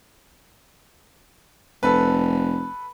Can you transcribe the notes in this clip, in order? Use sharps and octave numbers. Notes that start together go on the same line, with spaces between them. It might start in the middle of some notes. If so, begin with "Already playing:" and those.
F1 A4 B4